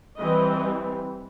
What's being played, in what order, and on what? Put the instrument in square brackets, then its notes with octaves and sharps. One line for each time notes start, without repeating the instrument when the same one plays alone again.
[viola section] E3 G3 C4 D#5